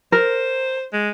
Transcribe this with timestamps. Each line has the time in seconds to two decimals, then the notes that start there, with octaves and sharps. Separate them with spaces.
0.12 A#4 C5
0.93 G#3